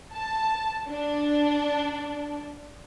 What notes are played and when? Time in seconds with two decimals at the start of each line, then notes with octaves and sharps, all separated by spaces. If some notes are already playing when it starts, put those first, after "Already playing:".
0.12 A5
0.88 D4